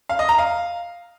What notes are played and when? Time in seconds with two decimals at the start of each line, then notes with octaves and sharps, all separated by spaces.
0.09 F5
0.19 D#5
0.29 A#5
0.38 F5